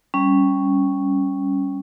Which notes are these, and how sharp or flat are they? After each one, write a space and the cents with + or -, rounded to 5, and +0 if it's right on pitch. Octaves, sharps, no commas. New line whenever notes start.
G3 +0 C#4 +0